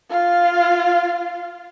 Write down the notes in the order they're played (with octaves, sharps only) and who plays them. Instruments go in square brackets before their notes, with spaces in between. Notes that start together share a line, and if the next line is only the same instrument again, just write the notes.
[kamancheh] F4 F5